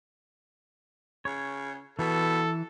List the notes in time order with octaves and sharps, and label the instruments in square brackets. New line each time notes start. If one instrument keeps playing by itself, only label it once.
[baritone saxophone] C#3 [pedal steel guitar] C#5
[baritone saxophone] B2 [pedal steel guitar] E3 [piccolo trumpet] A4